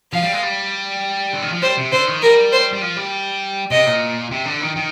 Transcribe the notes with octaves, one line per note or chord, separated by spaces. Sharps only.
F3 F5
G3
G#3
G3
D3
D#3
F3
G3 C5
C3
D3 C5
D#3
G3 A#4
C5
G3
F3
G3
C3 D#5
A#2
C3
D3
D#3
D#3